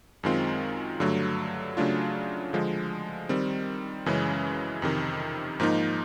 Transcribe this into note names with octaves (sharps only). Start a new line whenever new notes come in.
F#2 D#3 G#3 C4 F4
G2 D3 F#3 A3
C#3 F#3 A3 D4 F4
D3 F3 G#3
D#3 G3 C4
F#2 C#3 E3 G#3 C#4
F2 C3 D#3
G#2 F3 A#3 D#4